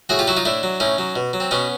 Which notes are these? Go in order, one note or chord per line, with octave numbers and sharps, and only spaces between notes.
A2 F#4 G#4
F4 G4
F#3 E4 F#4
D#4 F4
A2 D4 E4
F#3
A2 C#4 D#4
F#3
B2
F#3
C4
B2 B3 C#4